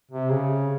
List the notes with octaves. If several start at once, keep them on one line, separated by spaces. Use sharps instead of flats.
C3
C#3